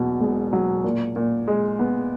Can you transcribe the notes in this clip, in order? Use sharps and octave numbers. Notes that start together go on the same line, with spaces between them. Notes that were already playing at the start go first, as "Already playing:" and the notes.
Already playing: E2 B2 F#3
E1
F#3
A#2
A#2
G#3
B3